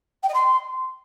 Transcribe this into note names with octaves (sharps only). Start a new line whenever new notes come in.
G5
D#5
C6